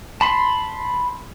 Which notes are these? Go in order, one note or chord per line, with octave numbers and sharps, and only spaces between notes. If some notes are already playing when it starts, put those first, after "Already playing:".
A5 B5 C6